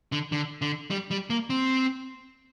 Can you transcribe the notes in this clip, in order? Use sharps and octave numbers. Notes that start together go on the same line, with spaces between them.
D3
D3
D3
G3
G3
A#3
C4